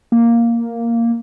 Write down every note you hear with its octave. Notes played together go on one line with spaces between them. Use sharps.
A#3